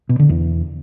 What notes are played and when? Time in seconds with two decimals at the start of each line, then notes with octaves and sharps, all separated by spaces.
0.09 B2
0.19 D3
0.29 E2